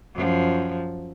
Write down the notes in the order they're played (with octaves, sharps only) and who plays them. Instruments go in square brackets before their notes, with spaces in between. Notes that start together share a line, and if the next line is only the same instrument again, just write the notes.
[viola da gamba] F#2 F3